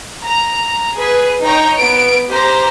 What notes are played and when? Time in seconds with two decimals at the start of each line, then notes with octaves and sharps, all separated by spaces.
0.22 A#5
0.95 G#4 B4
1.43 D#4 C#5 G5 A#5
1.78 B3 D7
2.28 G4 C5 A#5